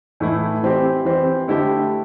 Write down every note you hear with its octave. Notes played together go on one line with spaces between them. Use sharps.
A2 E3 A3 E4
E3 C4 G4
E3 C4 G4
D3 A3 E4 G4